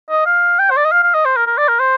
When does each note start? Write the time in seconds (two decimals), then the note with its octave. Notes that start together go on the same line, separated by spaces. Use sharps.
0.10 D#5
0.26 F5
0.59 G5
0.70 C5
0.77 D5
0.85 D#5
0.92 F5
1.03 F5
1.14 D#5
1.25 C5
1.36 A#4
1.47 A#4
1.58 D5
1.69 A#4
1.80 C5